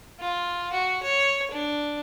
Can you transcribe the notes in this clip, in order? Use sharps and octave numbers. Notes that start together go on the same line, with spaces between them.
F4
F#4
C#5
D4